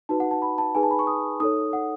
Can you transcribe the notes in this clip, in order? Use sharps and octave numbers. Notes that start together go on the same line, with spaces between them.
D#4 F#4 B4 A5
F#5
A5
B5
A5
D#4 G#4 B4 G#5
A5
B5
C#6
D#6
D#4 A4 C#5 D#6
F#5